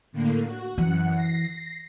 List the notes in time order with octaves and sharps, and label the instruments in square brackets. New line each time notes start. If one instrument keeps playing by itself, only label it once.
[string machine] A2 D3 A#3
F#4
[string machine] F#2 F#5 [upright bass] E3
[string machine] A#6 C7